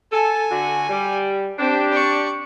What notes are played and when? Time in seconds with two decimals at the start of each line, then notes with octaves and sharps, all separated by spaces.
0.12 A4 G#5
0.51 D3 F#4
0.90 G3
1.59 C4 D4 G4
1.92 D5 C#6